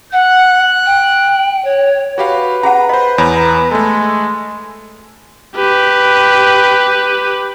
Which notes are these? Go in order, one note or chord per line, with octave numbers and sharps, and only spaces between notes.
F#5 F#6
G5
C#5
F#4 G4 B4 F5
C#4 G#4 F#5 A#5
C5 D#5 B5
E2 C#5 A#5 B5
G#3 A3 A4
G4 B4